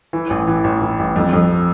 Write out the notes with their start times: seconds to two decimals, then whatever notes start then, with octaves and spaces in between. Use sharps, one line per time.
0.13 E3
0.30 A1
0.47 E3
0.64 A1
0.82 E3
0.99 A1
1.16 F2
1.33 F2